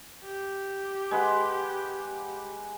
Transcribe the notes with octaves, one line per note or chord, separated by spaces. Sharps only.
G4
G#3 B4 F#5